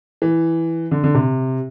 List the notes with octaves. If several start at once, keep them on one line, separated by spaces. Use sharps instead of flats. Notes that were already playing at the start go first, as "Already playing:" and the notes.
E3
D3
D3
C3